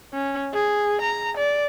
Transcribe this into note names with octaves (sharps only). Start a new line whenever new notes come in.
C#4
G#4
A#5
D5